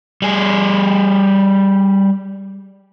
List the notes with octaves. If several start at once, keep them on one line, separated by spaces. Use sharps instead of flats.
G3 G#4